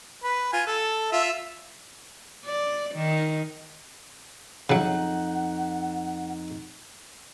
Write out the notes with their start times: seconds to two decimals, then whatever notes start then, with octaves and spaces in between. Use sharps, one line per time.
0.23 B4
0.53 F4 G#5
0.67 A4
1.12 F4 E5
2.45 D5
2.95 D#3
4.70 F2 C#3 F#3 D#4 F#5 F#6